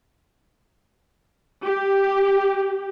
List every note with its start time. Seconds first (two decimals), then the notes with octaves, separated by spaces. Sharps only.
1.63 G4